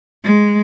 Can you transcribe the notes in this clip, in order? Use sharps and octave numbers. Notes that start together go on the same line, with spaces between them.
G#3